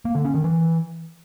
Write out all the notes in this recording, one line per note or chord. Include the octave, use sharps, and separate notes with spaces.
A#3
D3
C#4
D#3
E3